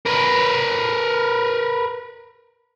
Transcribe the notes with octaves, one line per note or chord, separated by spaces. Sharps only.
A#4 B4